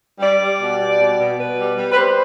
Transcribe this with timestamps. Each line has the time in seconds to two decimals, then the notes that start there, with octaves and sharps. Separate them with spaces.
0.19 G3 D5
0.40 G3
0.59 B2
0.79 G3
0.98 B2
1.18 B2
1.38 B2 B4
1.58 G3
1.77 G3
1.91 B4
1.96 G3 C5